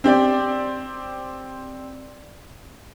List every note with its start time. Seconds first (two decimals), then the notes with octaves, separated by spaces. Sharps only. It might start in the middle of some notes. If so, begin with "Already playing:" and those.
0.04 C4 G4 D5